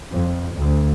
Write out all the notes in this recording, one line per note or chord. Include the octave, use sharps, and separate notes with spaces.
F2
D2